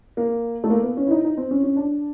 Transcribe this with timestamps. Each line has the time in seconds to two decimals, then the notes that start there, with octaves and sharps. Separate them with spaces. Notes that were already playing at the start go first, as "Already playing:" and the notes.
0.17 A#3
0.64 A3
0.70 A#3
0.83 B3
0.97 C#4
1.07 E4
1.11 D#4
1.24 D#4
1.37 C4
1.51 C#4
1.64 C#4
1.76 D4